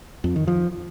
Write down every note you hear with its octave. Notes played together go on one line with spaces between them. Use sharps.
F2
D#3
F3